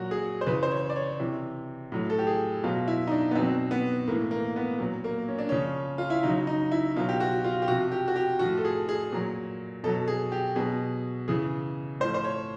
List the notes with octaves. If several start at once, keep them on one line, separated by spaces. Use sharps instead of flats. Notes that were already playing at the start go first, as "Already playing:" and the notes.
Already playing: A#2 F#3 F#4
G#4
C5
C#3 E3 B4
C5
C#5
D5
C#5
C3 E3
A2 F#3
A4
G4
G#4
B2 F#3 F4
E4
D#4
D4
B3
B2 F#3 C4
B3
A2 E3 A#3
A#3
B3
A#2 F#3
A#3
C#4
D4
C#3 F3 C#4
F4
E4
C#3 F#3 D#4
D#4
E4
B2 F#3 F4
G4
F#4
F4
G4
C3 F3 F#4
G4
F#4
G4
A2 F3 F#4
A4
G#4
G#4
A#2 F#3
B2 F#3 A4
G#4
G4
B2 F#3 G#4
C#3 E3 G#4
A2 F3 C5
C5
C#5